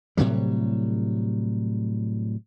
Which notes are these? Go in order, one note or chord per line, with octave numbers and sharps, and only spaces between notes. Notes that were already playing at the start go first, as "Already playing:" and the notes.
A2 C3 F#3 G3